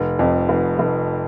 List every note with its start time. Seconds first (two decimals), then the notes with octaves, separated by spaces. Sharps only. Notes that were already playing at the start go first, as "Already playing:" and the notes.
Already playing: F1
0.19 F2
0.49 F1
0.79 F1